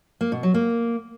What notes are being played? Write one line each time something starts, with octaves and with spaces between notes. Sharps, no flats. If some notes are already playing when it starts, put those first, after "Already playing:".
A#3
B2
F#3
A#3